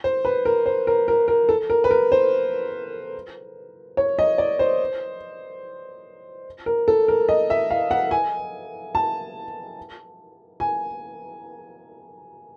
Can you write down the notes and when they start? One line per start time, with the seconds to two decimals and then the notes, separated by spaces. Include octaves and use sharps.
0.04 C5
0.25 B4
0.45 A#4
0.66 C5
0.87 A#4
1.08 A#4
1.28 A#4
1.49 A4
1.70 A#4
1.84 B4
1.91 A#4
2.12 C5
3.97 C#5
4.19 D#5
4.38 D5
4.59 C5
6.66 A#4
6.88 A4
7.08 A#4
7.29 D#5
7.50 E5
7.71 F5
7.91 F#5
8.11 G#5
8.95 A5
10.60 G#5